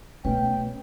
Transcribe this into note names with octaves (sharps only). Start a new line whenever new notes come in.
B2 A3 C#4 B4 G5